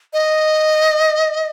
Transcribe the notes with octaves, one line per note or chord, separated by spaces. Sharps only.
D#5